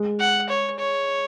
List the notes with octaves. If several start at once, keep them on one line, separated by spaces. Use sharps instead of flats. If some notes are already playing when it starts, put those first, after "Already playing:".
Already playing: G#3
F#5
C#5
C#5